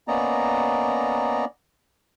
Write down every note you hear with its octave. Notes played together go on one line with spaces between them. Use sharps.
A#3 B3 C#4 D5 D#5 A#5